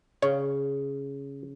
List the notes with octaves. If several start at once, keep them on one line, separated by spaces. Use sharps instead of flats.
C#3 C#5